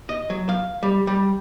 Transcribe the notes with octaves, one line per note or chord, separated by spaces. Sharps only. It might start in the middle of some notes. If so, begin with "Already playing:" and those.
D#5
F#3
F5
G3
G3